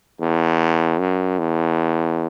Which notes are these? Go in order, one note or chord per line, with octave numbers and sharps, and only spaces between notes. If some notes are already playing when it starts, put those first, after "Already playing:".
E2
F#2
E2